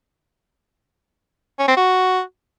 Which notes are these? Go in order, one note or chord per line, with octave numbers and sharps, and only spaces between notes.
C#4
C4
F#4